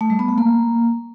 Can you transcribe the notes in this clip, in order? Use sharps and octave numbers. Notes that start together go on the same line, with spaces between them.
A3
G3
B3
A3
A#3